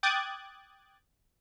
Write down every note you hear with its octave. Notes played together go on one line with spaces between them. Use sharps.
G5 D6 D#6 F#6 G#6 A6